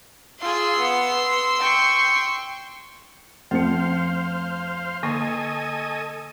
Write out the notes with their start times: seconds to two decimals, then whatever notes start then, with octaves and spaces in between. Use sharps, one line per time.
0.40 F4 G#4 C6 E6
0.79 B3
1.58 G5 C#6
3.51 F2 A3 C4 C5 F5 C#7
5.03 D3 A#3 A4 D#5 G#5 C#6